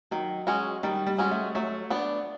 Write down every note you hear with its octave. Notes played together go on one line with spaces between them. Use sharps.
D#3 F#3
G#3 C#4 F#4
D#3 G3
G3
G#3 C#4 F#4
A3
F#3 A3
B3 D4